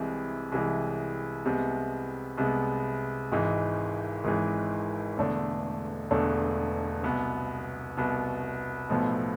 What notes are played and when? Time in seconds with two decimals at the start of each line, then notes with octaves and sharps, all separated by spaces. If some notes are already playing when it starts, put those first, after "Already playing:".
Already playing: C2 C3 E3 G#3
0.52 C2 C3 E3 G#3
1.45 C2 C3 G#3 B3
2.37 C2 C3 G#3 B3
3.32 G#1 G#2 E3 G#3
4.24 G#1 G#2 E3 G#3
5.17 E1 E2 D3 A3 D4
6.11 E1 E2 D3 A3 D4
7.03 C2 B2 B3
7.97 C2 B2 B3
8.90 B1 A2 F3 B3